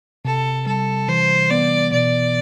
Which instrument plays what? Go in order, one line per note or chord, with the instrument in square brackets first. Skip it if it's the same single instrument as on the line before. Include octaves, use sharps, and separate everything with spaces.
[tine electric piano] C3 [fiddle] A4
[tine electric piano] G3 [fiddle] A4
[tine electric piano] E3 [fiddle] C5
[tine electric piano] B3 [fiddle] D5
[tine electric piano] B2 [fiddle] D5